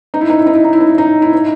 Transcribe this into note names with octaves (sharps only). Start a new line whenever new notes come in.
D#4
E4
D#4
E4
D#4
E4
D#4
E4
D#4
E4
D#4
E4
D#4